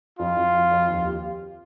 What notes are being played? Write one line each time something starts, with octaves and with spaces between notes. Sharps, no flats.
F2 F4
F2
F2
F2
D#2
G4